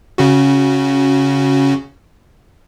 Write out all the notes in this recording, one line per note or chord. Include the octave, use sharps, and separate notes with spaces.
C#3 C#4 F#4